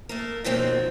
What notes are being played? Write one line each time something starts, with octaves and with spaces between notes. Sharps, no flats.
A3 A#3 A#4
B2 D#3 F3 F#3 A#3 C4